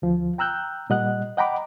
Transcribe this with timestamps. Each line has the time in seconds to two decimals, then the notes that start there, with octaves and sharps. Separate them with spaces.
0.02 D2 F3
0.38 G5 A#5 E6 F#6 G6
0.90 A#2 G3 D#5 F#5 F#6
1.37 D#5 F#5 G5 A#5 B5 D6